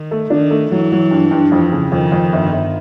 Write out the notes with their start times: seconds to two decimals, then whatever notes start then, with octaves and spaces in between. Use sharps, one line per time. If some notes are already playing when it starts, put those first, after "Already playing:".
Already playing: D#3
0.11 A3
0.30 D#3 D4
0.50 A3
0.71 E3 F#3
0.92 F#3
1.11 G2
1.31 G2
1.52 F2 E3
1.72 C#3
1.92 F2 D#3
2.12 F2
2.33 G1
2.52 G1